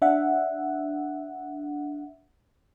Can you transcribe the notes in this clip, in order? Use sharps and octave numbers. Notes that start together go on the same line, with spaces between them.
D4 E5 F#5